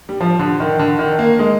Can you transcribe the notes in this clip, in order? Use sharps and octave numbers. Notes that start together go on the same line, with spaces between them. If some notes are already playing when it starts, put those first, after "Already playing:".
G3
F3
D3
D#3
D3
D#3
A#3
G#3